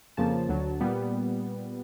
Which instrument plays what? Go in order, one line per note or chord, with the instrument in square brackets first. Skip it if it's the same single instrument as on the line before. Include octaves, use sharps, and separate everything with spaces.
[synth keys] F2 C#3 F3 A#3 A5
D2 D3 F#3
A#2 G3 B3